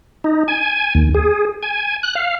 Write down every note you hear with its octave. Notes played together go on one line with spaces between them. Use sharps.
D#4
G#5
D#2
G#4
G#5
F#6
F5